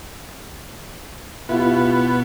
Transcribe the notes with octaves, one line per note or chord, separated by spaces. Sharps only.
B2 B3 E4 F4 G4